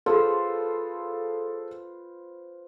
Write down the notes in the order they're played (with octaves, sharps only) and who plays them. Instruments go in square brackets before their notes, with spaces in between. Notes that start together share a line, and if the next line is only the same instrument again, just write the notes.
[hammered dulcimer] F4 B4 C5 [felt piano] G#4 A4